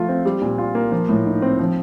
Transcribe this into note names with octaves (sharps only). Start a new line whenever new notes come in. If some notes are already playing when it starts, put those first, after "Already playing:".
Already playing: F3 A3 F4
C4
G3
A#2
F4
A#3
F3
A2
D#4
C4
F3